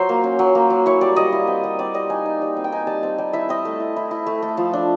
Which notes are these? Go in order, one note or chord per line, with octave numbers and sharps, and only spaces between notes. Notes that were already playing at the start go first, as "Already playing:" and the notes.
Already playing: F#3 C5
A#3
C#4
F#3
A#3
F#3
E4 C#5
G3 D5
G3 D#5
E4
C4
G3
C4 D5
G3 D#5
D#4 G#5
D#4
G3
C4
G5
D#4 G#5
G3 A5
C4 A5
G3
E4 E5
C4 D#5
A3
E4
E4
E4
A3
A3
F3
D4